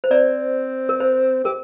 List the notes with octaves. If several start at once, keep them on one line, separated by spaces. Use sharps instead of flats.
C5
C4 D5
A#4
C5
G4 A#4